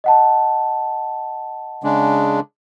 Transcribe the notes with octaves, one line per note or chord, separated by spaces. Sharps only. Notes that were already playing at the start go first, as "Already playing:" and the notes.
D#5 F#5 A5
C#3 G#3 D4